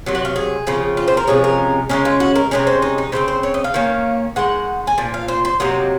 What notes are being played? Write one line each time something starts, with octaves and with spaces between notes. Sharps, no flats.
C3 D#3 F#3
F#5
F5
G#4
C#3 F3 C4
F4
C5
A#4
C3 F3 G#3 C#4 G#4
A#4
C#3 G#3 C#4 A#4
F4
F#4
A#4
C3 F3 G#3 C#4 A#4
C5
D#4
D#4
C#3 G#3 C4 C5
C5
C#5
D#5
F5
D#3 A#3 C#4
D#3 G#3 F#5
G#5
A#2 F3
F5
C5
C5
C3 F#3 A#3 D#4